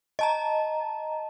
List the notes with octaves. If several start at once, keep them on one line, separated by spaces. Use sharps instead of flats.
D#5 A5 A#5